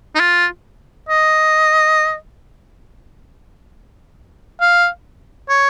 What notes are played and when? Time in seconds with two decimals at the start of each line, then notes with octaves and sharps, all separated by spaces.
0.15 D#4
0.20 F4
1.09 D#5
4.61 F5
5.49 C#5